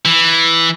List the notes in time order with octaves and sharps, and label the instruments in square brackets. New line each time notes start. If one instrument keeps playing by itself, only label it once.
[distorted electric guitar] E3